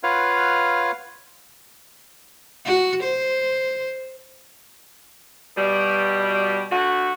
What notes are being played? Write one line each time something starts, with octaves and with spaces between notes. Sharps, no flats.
F4 B4 C#5 F5 F#5 F6
F#4
C5
B2 G3
D3 A3 F#4